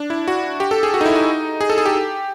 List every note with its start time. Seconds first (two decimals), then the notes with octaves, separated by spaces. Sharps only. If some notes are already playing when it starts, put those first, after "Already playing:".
Already playing: D4
0.10 E4
0.28 F#4
0.60 G4
0.71 A4
0.83 G#4
0.94 F#4
1.01 D#4
1.06 E4
1.16 D#4
1.61 G#4
1.70 A4
1.78 G#4
1.86 G4